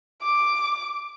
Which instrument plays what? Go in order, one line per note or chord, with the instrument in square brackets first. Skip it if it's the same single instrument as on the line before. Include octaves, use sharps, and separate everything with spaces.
[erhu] D6